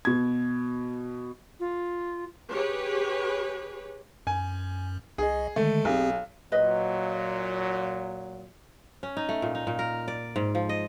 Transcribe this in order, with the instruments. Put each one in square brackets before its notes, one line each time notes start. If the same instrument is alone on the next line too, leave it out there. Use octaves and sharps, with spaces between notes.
[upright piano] B2 G#6
[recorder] F4
[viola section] G4 G#4 B4 C#5
[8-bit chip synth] F#2 [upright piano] G#5
[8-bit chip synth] C2 D#5 [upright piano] G#4
[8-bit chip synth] D3 D#3 G#3 [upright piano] A3
[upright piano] B1 [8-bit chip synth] C4 G4 G#4
[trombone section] A#2 F#3 [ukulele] B4 D#5
[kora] C#4
D#4
A3
A#2
D#4
A#2
A#4
D5
G#2
F3
D#5